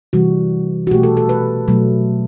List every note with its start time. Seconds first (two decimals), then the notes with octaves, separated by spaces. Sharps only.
0.13 C3 E3 G3 F#4
0.87 F#4
0.91 B2 A3 G4
1.03 A4
1.17 A4
1.29 B4
1.68 B2 F#3 A3